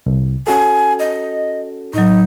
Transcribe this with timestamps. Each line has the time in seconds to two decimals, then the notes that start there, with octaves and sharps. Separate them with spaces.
0.06 C2
0.47 C#4 F#4 A4 G#5
0.99 D#5
1.93 A2 F#3 D#4